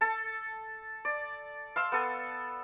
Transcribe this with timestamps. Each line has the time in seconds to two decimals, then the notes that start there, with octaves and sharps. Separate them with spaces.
0.01 A4 A5
1.05 D5
1.76 F5 C6 E6
1.92 B3 A4